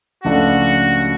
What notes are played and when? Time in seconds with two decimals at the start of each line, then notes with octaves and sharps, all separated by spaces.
0.24 C#2 C#3 F3 A3 D4 F#4